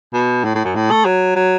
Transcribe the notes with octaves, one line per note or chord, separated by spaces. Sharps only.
B2
A2
A2
F#2
A2
A3
F#3
F#3